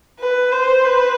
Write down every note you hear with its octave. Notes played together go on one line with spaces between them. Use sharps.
B4
C5
B4